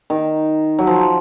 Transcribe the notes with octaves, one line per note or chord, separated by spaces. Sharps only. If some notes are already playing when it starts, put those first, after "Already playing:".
D#3
F#3
F3